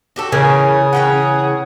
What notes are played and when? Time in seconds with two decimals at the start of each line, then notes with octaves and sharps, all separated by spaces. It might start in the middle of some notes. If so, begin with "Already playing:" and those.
0.16 F#4 G4 A4
0.32 C#3 E3 B3 C#4 G#4 A#4
0.93 E3 C#4 F#5 G5